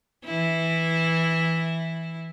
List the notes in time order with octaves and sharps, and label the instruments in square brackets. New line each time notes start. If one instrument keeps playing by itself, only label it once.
[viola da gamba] E3 E4